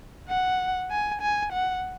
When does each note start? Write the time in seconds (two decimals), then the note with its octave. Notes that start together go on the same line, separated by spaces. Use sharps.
0.29 F#5
0.91 G#5
1.22 G#5
1.52 F#5